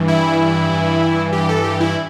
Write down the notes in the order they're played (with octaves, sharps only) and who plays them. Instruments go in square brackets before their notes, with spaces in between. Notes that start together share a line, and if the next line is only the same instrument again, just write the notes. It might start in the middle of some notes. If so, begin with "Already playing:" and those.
Already playing: [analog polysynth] G2 E3
E4
G2 E3
G4
A4
G4
E4